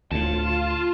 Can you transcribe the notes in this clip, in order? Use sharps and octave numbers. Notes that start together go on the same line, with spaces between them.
D2 A2 F4 A5